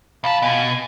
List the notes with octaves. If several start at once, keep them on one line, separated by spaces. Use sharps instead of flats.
C2 F4 A5 B5
B2 G#5